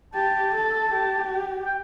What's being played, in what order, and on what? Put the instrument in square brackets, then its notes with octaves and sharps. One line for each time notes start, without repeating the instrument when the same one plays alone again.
[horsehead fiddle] G4 [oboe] A5
[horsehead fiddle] A4
G4
[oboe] G5